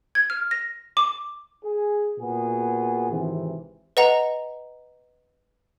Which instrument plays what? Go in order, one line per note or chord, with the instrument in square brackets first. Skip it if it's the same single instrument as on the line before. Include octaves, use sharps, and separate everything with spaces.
[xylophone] G#6
F6
A#6
D6
[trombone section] G#4
A#2 B3 F#4 G#4
G#1 C3 E3
[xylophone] B4 D#5 F#5 A#5